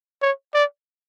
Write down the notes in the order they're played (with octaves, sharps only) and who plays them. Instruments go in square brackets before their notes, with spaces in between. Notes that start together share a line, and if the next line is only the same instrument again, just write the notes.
[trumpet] C#5
D5